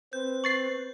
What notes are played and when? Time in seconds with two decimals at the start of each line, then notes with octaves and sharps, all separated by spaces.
0.13 C4 B4 G6
0.44 B4 C#6 A6 C7 F#7